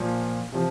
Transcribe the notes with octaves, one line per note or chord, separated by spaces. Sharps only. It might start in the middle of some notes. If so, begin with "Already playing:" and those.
Already playing: A#2 F3
C3 F3